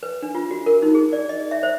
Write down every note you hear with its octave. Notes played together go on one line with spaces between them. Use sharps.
B4
D4
F4
F#4
A#4
D#4
G#4
D5
D#5
E5
C5